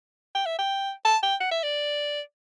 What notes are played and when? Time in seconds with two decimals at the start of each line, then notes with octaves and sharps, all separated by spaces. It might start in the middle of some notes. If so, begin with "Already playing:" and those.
0.35 G5
0.46 E5
0.59 G5
1.05 A5
1.23 G5
1.40 F#5
1.52 E5
1.63 D5